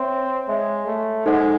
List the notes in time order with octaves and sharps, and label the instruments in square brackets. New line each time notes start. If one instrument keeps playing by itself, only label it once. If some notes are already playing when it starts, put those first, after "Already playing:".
Already playing: [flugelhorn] C4 [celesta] C#5 E5 C6
[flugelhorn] G#3 [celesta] C#5 E5 C6
[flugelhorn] A3
[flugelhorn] G#3 [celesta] D#4 A4 C5 F#5